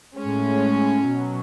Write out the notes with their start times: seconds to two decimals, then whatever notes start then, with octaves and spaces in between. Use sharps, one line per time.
0.18 A2 G#3 C#4
1.08 B2 F#3